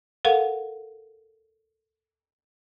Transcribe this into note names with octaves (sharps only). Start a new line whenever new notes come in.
A4 A#4 F5 F#5